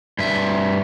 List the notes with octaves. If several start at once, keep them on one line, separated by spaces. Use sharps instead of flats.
G2 E5